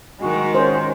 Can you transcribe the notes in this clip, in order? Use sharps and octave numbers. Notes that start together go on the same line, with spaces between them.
D#3 G#3 F#4
C#4 C5